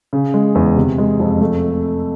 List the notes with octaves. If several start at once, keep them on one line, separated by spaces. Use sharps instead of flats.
C#3
G#3
E2
C3
G#3
F2
A3